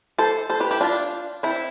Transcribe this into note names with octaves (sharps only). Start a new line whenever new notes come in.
A4 C5
A4 C5
G4 B4
E4 G4
D4 F4
C4 E4